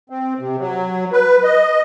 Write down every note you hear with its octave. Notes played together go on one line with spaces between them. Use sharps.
C4
C3
F#3
B4
D#5